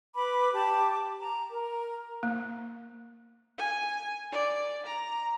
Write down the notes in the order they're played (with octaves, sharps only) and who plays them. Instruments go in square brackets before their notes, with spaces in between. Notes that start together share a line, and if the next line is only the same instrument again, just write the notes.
[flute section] B4 B5 D6
G4 A5 D6
A#5
A#4
[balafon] A#3
[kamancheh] G#5
D5
A#5